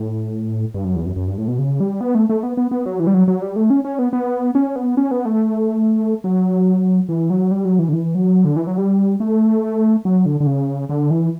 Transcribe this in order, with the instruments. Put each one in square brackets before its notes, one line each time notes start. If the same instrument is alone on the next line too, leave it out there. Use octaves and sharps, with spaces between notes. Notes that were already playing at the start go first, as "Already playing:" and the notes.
Already playing: [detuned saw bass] A2
G2
F#2
E2
F#2
F#2
G2
A2
B2
C#3
G3
B3
A3
A3
B3
B3
B3
F#3
E3
G3
F#3
F#3
G3
A3
C#4
C#4
B3
B3
C#4
B3
C#4
B3
A3
F#3
E3
F#3
G3
F#3
E3
D3
E3
F#3
D3
E3
F#3
G3
A3
F#3
D3
D3
C#3
D3
E3